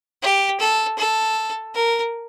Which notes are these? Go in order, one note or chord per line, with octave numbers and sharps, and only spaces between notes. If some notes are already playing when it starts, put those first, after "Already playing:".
G4
A4
A4
A#4